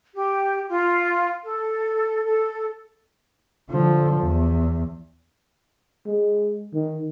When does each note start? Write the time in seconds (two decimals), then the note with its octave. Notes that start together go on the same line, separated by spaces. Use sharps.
0.15 G4
0.68 F4
1.44 A4
2.25 A4
3.70 D3 F3
4.22 E2
6.06 G#3
6.74 D#3